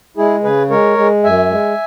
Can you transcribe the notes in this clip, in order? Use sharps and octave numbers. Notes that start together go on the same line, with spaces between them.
G#3 E4 G#4
C#3 G#4 B4
G#3 A#4 C#5
G#3
F#2 E5 G#5
G#3